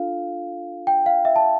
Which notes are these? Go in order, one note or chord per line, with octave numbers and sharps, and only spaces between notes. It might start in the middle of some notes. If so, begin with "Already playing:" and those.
Already playing: D4 F4 A4 F5
G5
F5
E5
A5